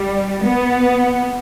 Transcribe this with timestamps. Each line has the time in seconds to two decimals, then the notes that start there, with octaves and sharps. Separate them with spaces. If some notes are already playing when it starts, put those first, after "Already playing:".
Already playing: G3
0.44 B3